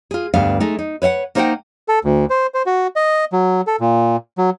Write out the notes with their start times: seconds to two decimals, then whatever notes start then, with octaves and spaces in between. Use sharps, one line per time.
0.11 F4 G#4
0.34 D2 G2 B3 D4 F5
0.60 G#3 A3 D#4
0.79 D#4
1.02 B4 C#5 E5 F#5
1.35 A#3 D#4 C5 D#5 F#5 G5
1.88 A4
2.05 D2
2.30 C5
2.54 C5
2.66 F#4
2.96 D#5
3.32 F#3
3.67 A4
3.80 A#2
4.38 F#3